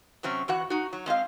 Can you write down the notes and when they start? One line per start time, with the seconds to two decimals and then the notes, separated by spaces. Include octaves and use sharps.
0.23 C3 F#3 C4 C#4
0.48 E3 F#4 F#5
0.70 D#4 F#4
0.93 F#3
1.06 G#3 C4 D#5 F5